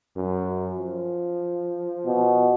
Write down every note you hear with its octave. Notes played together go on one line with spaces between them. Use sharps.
F#2
F3
B2